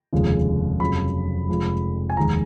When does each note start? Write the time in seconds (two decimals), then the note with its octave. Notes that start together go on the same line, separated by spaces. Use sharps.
0.13 F1 D#2 C#3 F3 G#3
0.80 F1 F2 C#3 F#3 B5
1.49 F1 F2 F3 G#3
2.10 G#5
2.17 F1 D#2 D#3 G#3 A#5